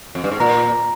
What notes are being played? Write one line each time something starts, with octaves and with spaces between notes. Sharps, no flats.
F2
G2
G#2
A#2 A#5 A#6